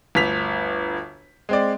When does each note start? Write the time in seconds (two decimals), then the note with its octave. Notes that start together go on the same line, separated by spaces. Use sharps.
0.15 G1 D2 B6 F7
1.49 G#3 C4 D5